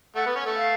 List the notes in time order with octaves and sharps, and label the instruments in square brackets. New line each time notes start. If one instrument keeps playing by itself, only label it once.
[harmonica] A3 A4 [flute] F#5
[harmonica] B3 B4
C#4 C#5
A3 A4
[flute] F5